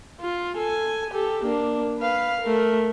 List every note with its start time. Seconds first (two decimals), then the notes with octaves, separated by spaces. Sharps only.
0.20 F4
0.58 A4 G#5
1.11 G4 A4
1.44 A#3 D4
1.99 B4 F5
2.42 A3 A#4